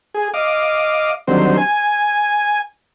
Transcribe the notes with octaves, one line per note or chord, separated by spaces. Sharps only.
G#4
D#5 F5 D6
D3 D#3 F#3 G3 C4 C5
G#5